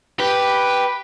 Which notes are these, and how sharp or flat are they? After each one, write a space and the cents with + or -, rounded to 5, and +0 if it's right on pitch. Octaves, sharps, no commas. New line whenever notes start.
G4 +0 B4 +0